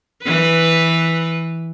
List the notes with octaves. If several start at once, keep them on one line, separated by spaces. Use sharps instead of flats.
E3 B4